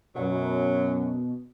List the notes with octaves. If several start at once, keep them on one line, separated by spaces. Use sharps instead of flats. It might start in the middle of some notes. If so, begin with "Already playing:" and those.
F#2 B2 F#3